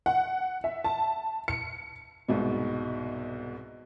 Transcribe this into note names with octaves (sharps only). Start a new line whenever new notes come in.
F#5
E5
A5
C#7
C2 G#2 B2